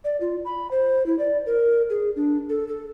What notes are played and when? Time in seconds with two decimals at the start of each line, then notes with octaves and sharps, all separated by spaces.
0.04 D5
0.21 F4
0.45 B5
0.71 C5
1.06 E4
1.19 D5
1.46 A#4
1.90 G#4
2.16 D4
2.49 A4
2.68 A4